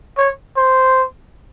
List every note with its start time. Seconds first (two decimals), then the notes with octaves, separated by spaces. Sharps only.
0.17 C#5
0.56 C5